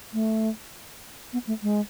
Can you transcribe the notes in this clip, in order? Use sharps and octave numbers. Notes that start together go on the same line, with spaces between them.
A3
B3
A3
G#3